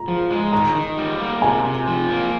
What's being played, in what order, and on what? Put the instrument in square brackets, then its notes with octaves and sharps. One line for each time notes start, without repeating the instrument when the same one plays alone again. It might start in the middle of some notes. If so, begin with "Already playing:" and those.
Already playing: [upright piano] A#5
[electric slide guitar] F3
G#3
[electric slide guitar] D#3 [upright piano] A#5
[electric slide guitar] D#3
G3
A#3
[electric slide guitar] C3 [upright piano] G#5
[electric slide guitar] C3
F3
A#3